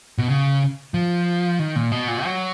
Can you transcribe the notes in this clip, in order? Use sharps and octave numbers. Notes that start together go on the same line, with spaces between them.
B2
C#3
F3
D#3
A#2
B2
A#2
F#3